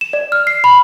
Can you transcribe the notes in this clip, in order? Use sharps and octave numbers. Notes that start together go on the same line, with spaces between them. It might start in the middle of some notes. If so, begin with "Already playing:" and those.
E7
D5
F6
C7
B5